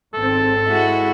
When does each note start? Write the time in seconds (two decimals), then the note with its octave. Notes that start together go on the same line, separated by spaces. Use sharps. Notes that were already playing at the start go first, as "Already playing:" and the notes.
0.14 G#1 C4 A4
0.67 G#3 E4 F#4